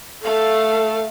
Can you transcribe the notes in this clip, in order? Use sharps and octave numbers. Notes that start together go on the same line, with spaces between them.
A3 A4 F5